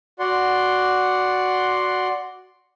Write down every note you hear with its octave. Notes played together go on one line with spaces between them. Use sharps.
F#4 D5 F#5 C6